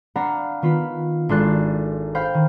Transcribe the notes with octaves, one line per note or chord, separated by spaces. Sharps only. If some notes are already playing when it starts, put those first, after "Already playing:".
D4 F5 F#5 A#5 B5
D#3 B3 F4 B5
G#1 D4 A4 C6 F#6 A6
C5 F5 G5 B5 F6 G6
D#3